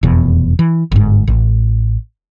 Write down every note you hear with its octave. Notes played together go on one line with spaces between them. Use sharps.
F1 E2 B2
E3
G1 G#2
A1